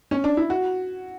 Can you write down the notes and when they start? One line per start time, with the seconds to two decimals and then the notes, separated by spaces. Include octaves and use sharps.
0.11 C#4
0.24 D4
0.37 E4
0.50 F#4